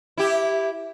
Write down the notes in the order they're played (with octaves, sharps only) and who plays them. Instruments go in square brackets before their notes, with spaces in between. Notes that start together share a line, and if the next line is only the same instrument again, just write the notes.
[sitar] E4 G4